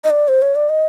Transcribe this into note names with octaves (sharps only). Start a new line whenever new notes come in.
D#5
D5
C5
C#5
D5
D#5